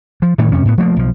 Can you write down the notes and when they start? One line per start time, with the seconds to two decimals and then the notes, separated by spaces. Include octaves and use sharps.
0.22 F3
0.38 A2 D#3 E3 A3
0.52 F2 C3 C#4
0.65 A2 B3
0.78 F3 A3 A#3
0.97 B1 F3